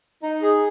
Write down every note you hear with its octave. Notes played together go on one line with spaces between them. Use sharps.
D#4
G#4